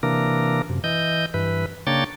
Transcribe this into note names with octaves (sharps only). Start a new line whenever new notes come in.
C3 E3 A#3 D4 A#4
F#2 C3
E3 D#5 G6
G2 E3 B4
C#3 A#3 D4 C#5 G5 A6